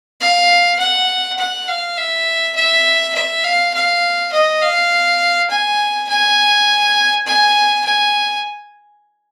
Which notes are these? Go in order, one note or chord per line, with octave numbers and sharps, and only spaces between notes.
F5
F#5
F#5
F5
E5
E5
E5
F5
F5
D#5
F5
G#5
G#5
G#5
G#5